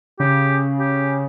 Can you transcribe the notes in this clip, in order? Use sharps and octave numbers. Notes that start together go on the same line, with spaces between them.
C#3 G4
G4